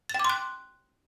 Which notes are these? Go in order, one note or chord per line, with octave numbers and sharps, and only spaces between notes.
A6
G5
D6
C6
F#6